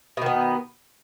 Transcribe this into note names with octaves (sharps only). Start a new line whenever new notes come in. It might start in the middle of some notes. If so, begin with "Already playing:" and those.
B2 D#3 B3